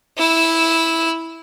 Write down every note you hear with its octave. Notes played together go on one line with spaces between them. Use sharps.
E4 E6